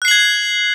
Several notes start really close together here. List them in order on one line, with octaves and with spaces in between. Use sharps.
F#6 C7 F#7 G#6